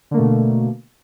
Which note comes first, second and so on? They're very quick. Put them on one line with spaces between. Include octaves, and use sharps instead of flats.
D3 A#3 A3 B2